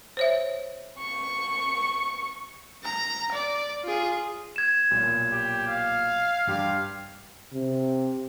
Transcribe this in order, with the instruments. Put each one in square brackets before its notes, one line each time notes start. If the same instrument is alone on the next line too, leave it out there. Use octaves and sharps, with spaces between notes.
[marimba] C5 C#5 E5
[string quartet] C#6
[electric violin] A#5
D5
F4 G#4
[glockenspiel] G#6 E7
[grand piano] B1 A#2
[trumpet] G4
F5
[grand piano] G2 G4 C6 [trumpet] F5
[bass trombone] C3